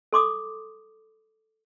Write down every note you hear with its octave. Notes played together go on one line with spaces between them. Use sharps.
A4 C6 D6 D#6